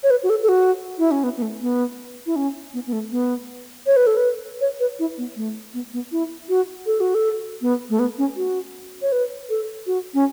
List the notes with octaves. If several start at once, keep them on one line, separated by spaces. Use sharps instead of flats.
C#5
B4
F#4
A4
A4
F#4
E4
C#4
B3
B3
A3
B3
E4
C#4
B3
B3
A3
B3
C#5
B4
A4
B4
C#5
B4
E4
B3
A3
B3
B3
E4
F#4
A4
F#4
A4
B3
A3
B3
C#4
F#4
C#5
B4
A4
F#4
C#4